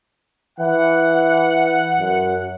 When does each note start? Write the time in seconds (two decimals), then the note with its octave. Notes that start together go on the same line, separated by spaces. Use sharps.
0.59 E3 F#5
1.99 F#2